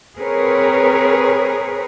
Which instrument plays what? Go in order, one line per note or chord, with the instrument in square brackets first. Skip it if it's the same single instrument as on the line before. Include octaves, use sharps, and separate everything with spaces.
[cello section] C4 G#4 A#4 B4 C#5